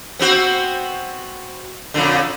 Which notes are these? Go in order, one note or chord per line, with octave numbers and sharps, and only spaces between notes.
B3 C4 F#4
F2 A#2 D3